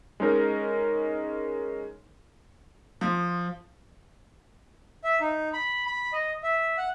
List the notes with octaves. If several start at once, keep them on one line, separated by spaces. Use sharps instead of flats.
G#3 C#4 D#4 A#4
F3
E5
D#4
B5
B5
D#5
E5
F#5